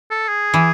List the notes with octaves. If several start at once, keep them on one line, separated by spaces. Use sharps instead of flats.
A4
G#4
E3